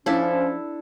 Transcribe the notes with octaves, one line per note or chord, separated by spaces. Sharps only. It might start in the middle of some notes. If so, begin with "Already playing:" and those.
F3 C#4 D4 E4 A4